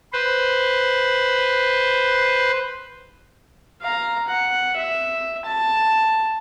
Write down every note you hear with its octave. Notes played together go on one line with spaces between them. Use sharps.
B4 C5
F5 A#5
F#5
E5
A5